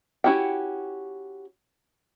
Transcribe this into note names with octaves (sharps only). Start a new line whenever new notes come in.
C#4 E4 F#4 G4 G5